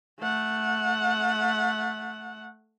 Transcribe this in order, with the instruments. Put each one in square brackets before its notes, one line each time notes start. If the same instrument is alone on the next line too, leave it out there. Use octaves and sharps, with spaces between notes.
[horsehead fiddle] A3 F#5